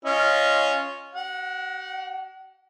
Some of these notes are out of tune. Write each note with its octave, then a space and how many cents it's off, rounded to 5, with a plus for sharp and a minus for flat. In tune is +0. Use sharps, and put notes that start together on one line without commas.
C#4 +0 F4 -10 D#5 +0
F#4 +40 F#5 -20